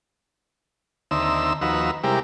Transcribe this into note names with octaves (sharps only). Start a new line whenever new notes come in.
D#2 D3 C4 D#4 E5 E6
D#2 F3 D#4 F#4 B4 E6
C3 G3 G#3 E4 G4 A#4